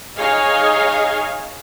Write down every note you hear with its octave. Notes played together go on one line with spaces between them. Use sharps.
D#4 G#4 C#5 D#5 F5 G#5